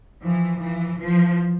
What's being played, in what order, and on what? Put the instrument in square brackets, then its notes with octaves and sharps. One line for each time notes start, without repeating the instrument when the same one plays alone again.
[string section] E3 [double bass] F3
[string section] E3 [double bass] F3
[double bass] E3 [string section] F3